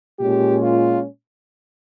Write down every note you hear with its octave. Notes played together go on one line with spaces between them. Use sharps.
A#2 G#3 C#4 G4
F4